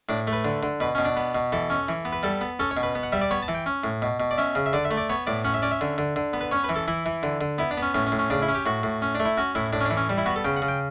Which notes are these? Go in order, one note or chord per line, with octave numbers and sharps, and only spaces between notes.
A2 D4
A3
B4
D3
D3
B2 B4
B2 C#4
D4
B3
B2
E3 A4
C#4
E3
B3
B4
G3 A4
B3
C#4 A4
C#5
B2
B4
B3
F#5
G3 E5
D5
B3 C#5
A5
E3
G5
C#4
A2
B2
B2
D5
C#4 E5
C#3
E5
D3 D5
E5
A3
D5
B3 C#5
A2 D5
C#4 F#5
E5
C#4 D5
E5
D3
D3
D3
B3
B4
C#4 C#5
B4
E3
A4
E3 E4
E3
D3
D3
B3 E4
D4
B3
C#4
A2 C#4
C#4
A2
C#4
C#3 D4
E4
C#4
G4
A2 F#4
A2
C#4
A3 D4
E4
C#4 F#4
A2 E4
A2 D4
C#4
D4
E3
C#4
G3
E4
B3 F#4
A4
C#3 G5
F#5
C#3
G5